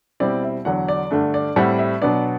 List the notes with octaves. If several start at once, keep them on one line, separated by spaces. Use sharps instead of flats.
B2 G3 C4 E4 D5
E5
E2 D3 F#3 F#5
D5
G2 D3 A3 D4
D5
A2 G3 C4 E4 F#5
E5
B2 F#3 B3 D4 D5